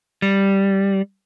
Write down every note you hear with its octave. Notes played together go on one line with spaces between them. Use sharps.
G3